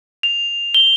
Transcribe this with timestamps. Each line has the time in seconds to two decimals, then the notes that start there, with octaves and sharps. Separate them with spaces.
0.23 F7
0.74 G7